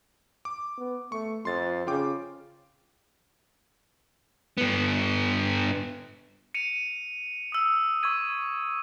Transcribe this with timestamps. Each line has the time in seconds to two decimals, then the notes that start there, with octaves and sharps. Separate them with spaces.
0.45 D6
0.77 B3
1.12 A3 C#6
1.45 F2 C6 A6
1.87 C#3 F4 G5 D6
4.58 G2 B3
6.54 C#7 D#7 F7
7.52 D#6 E6
8.03 C#6 D#6 E6 G#6 D#7